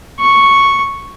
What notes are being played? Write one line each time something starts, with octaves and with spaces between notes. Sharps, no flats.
C#6